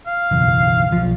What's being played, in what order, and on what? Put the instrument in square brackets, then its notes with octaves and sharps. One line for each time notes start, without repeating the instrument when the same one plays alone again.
[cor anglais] F5
[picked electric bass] F#1 B1 E2
B1 F3